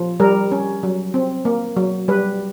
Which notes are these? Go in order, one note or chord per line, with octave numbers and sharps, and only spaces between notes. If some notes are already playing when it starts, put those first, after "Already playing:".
Already playing: F3
G3 A#4
C#4
F#3
C4
A#3
F#3
G3 B4